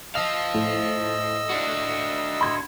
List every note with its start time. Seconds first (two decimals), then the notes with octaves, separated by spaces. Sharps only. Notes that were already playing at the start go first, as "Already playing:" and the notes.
0.15 C5 D#5 F5 E6 F7
0.54 A2
1.49 D4 F#4
2.41 B5 C6 G#6